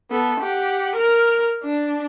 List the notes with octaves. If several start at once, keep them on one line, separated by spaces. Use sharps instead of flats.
B3 A4
G4 F#5
A#4 F6
D4